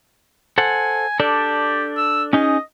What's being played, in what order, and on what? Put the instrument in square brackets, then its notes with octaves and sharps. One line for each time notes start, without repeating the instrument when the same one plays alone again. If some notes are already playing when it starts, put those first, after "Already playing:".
[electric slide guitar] A4 C5 F#5 [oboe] G#5
[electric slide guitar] D4 A4 D5 [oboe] G4
[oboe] E6
[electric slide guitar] C#4 D#4 G#4 [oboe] D#5